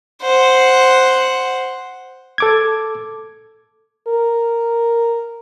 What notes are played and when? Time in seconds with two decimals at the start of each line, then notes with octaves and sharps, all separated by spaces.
0.23 C5 F#5
2.38 A4 D6 G#6
4.08 A#4